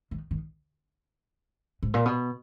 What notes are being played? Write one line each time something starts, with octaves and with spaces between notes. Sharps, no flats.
D#3
D#3
G#2
A#2
B2